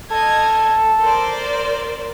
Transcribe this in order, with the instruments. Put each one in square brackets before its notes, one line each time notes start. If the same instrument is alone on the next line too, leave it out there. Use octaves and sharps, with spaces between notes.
[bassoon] A4 [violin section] D#5 F6 G#6
[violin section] A#4 C5 D5